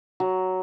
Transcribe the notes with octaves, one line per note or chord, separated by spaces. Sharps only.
F#3